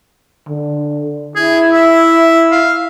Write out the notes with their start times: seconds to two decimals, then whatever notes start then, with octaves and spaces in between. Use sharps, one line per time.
0.48 D3
1.36 E4 G#4
1.72 E5
2.52 F5